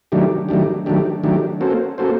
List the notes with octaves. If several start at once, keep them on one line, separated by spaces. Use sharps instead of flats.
D#3 F#3 A3 D4 G4
D#3 F#3 A3 D4 G4
D#3 F#3 A3 D4 G4
D#3 F#3 A3 D4 G4
A#3 C#4 F#4 A4 C5
A#3 C#4 F#4 A4 C5